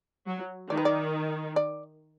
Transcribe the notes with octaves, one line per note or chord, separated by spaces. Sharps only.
F#3
D#3 D5
B4
D5
D5